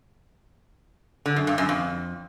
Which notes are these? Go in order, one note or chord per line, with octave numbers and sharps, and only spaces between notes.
D3
F#2
G2
F#2
F2